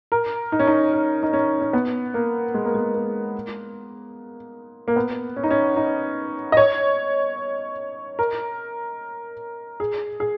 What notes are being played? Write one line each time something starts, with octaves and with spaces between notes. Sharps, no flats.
A#4
D#4
C#4
D#4
C#4
D#4
C#4
C#4
B3
A#3
G#3
A#3
G#3
A#3
A#3
B3
C#4
D#4
C#4
D#4
D#5
C#5
A#4
G#4
G#4